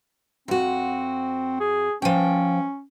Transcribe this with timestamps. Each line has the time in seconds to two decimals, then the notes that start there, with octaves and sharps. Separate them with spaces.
0.48 F2 C4 F#4
1.60 G#4
2.02 F3 C#4 G5